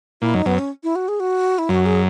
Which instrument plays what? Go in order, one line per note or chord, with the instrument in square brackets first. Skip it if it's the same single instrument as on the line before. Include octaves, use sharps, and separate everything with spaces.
[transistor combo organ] A#2 [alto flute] E4
[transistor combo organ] F#2 [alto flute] D#4
[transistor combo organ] F#2 [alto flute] B3
[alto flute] C#4
E4
F#4
G#4
F#4
E4
[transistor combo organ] F#2 [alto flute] F#4
[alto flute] G#4